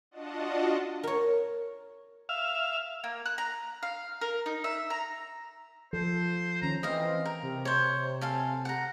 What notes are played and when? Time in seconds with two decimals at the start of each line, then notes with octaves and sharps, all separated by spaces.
0.11 D4 F4 F#4 D#5 F#5 A5
1.03 A#4 C#5
2.29 E5 F5
3.04 A#3
3.26 F#6
3.38 A#5
3.83 F5
4.21 A#4
4.46 D#4
4.64 E5
4.90 A#5
5.93 F3 A4 C5
6.62 D#3 C#4 A#5
6.83 E3 C4 D#5 F5
7.25 A#4
7.42 C3
7.65 C5 C#5
8.21 A4 F5 G#5
8.65 F#5 A#5